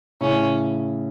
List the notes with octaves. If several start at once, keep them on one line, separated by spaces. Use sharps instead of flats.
A2 C#3 C#4